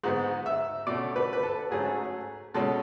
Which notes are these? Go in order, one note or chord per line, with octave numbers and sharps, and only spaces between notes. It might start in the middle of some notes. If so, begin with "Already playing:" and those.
G#2 G#3 B3
E5
B2 A3 C#4 D5
B4
B4
A4
G#2 F#3 A3 C#4 G#4
B2 G#3 C#4 A4